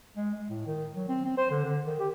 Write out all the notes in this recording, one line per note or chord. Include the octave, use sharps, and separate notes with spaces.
G#3
G#3
A2
D#3
F#3
C4
C4
C5
D3
D3
D#3
G4